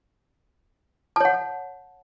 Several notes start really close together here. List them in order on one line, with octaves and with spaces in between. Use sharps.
A5 C#5 F#5